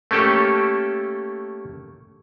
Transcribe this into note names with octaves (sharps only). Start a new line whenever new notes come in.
A3 A#3 C#4 G4 A4